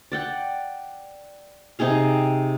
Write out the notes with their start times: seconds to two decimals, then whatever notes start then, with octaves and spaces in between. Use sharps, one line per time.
0.12 D5 F#5 G5
1.79 C3 D#4 G#4 F5